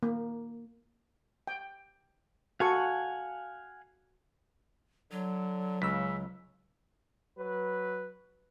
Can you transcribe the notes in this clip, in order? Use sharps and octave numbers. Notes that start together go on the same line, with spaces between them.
A#3
G5
F#4 A4 F5 F#5 G#5 C#6
D3 F#3
C#2 C#3 E6 B6
F#3 B4